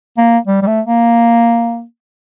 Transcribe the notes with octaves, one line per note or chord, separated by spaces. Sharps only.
A#3
G3
G3
A3
A#3